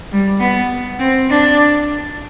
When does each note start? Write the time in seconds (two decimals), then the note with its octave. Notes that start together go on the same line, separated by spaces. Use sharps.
0.12 G3
0.40 B3
0.99 C4
1.29 D4